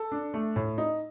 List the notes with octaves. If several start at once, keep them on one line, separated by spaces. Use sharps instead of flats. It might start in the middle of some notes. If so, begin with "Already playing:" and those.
Already playing: A4
D4
A3
A2
D#4